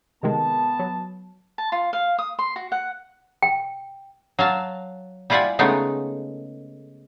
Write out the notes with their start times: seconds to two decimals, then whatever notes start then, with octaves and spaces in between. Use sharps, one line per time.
0.23 C3 D#3 G#3 B3 A5
0.79 F#3
1.58 A5
1.72 F4
1.93 F5
2.19 D#6
2.39 C6
2.56 F#4
2.72 F#5
3.42 G5
4.39 F#3 F5 A5
5.30 G3 E4 F4 D5 F#5 G#5
5.59 C#3 G#3 A3 B3 D#4